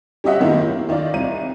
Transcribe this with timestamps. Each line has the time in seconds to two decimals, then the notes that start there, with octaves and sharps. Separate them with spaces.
0.24 G3 C#4 G4 D#5 E5 F#5
0.40 F#2 D#3 A#3 B3 E4
0.62 E4
0.89 D#3 D#4 F4 D5
1.13 C2 E3 D#7